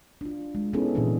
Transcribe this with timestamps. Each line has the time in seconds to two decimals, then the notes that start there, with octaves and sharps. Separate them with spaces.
0.21 D4 F4
0.55 G#3
0.73 B3 C#4 D#4 E4 G#4 A4
0.95 A#2 D3 E3 C4 D4 G#4